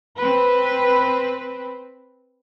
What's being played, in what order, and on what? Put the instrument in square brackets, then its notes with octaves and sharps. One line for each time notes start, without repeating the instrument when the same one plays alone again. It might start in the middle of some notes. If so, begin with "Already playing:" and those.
[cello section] C4 B4